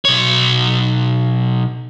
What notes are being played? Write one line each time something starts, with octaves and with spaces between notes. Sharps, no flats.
B1 C#5